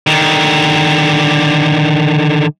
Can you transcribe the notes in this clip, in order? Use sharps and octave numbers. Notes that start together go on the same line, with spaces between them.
D3 D#3